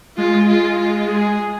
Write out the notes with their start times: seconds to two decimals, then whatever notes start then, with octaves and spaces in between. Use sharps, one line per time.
0.17 G#3 F4
0.48 F4
0.79 F4
1.09 G#4